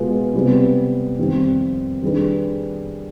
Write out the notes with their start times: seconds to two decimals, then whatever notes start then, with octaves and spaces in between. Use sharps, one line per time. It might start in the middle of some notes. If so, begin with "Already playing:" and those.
Already playing: B2 G#3 B3 F4
0.34 C3 G3 B3
1.18 F2 D#3 G3 C4
2.03 D#3 G3 D4 G#4 B4